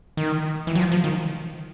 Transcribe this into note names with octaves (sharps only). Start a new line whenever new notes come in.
D#3
E3
F#3
F3
F3
D#3